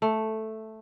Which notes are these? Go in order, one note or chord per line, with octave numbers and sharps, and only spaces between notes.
A3